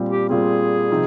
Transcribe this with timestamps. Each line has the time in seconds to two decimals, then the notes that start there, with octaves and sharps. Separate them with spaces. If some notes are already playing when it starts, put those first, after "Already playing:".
Already playing: A#2 G3 C4
0.09 G4
0.29 A#2 G3 C4 G#4
0.91 C3 F3 C4 D#4